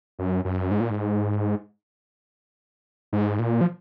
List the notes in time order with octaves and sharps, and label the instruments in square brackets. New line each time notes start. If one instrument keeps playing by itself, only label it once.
[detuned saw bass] F#2
F#2
G#2
A#2
G#2
G#2
A#2
F3